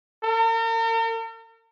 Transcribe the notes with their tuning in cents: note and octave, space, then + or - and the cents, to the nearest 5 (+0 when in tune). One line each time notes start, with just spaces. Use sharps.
A#4 -45